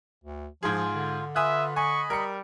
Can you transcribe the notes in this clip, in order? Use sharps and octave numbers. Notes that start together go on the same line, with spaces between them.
D2
G#2 F3 F4 G#4
D3
F4 B4 E5 G#5 D#6 F#6
D#5 G#5 B5 C#6
G3 A#4 C#7